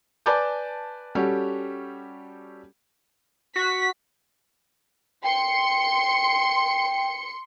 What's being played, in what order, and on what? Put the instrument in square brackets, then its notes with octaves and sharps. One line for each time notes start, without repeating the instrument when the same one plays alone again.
[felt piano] B4 D5 G#5 A5 D6 G6
G3 C#4 F#4 G4 A4
[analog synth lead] F#4 [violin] B6
[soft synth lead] G5 [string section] C6 C#7